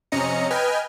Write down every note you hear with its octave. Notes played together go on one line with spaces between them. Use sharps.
F2 C3 C#4 D#5 A#5 C#7
B4 D#5 G5 G#5 F6